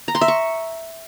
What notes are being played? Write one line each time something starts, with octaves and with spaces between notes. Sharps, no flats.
A#5
C6
E5
C#6